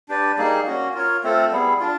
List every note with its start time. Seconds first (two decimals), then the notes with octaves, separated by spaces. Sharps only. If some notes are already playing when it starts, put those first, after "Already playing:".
0.09 D4 G4 B4 D5
0.37 G3 A#3 D#4 G#4
0.66 A#3 C#4 F#4
0.94 F4 A#4 C#5
1.24 A3 C4 F4 A4
1.51 G3 B3 E4 G#4
1.80 D4 F4